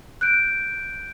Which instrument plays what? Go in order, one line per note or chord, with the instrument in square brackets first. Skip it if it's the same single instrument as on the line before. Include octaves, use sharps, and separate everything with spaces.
[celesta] F#6 G6 D7